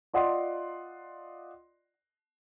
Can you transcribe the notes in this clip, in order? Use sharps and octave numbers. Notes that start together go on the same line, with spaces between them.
F4 D5 D#5 F#5 C6